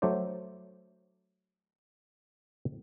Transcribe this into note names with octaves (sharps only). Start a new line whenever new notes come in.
F#3 A3 D4 C5 D5